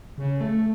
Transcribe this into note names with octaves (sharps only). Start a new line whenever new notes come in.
C#3
A3